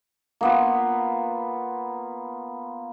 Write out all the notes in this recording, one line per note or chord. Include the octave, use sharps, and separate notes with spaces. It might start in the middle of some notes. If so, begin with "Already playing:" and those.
A#3 B3 F4